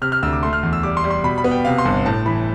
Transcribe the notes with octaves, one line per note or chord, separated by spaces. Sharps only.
C3 F6
F6
D2 E6
D6
A3 C6
F6
E2
E6
G3 D6
C6
G3
C6
B2 B5
B5
B3
G5
C3 F5
C6
G1
A2 A5
E3 B5